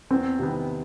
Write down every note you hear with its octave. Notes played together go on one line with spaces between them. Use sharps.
E2 C4
C3 D#3 G3 B3